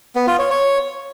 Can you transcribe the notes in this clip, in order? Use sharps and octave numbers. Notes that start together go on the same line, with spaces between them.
B3
F4
C#5
C#5